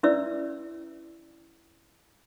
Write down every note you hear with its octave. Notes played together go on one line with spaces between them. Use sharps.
C#4 E4 B4 D5 E5 E6